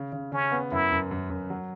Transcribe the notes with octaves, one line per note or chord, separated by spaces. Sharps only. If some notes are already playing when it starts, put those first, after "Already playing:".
Already playing: C#3
C#3
C#3 C#4
B3
F#2 E4
F#2
F#2
F#2
F#3